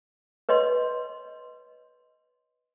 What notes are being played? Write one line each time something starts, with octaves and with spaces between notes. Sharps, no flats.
B4 C#5 D#5 C6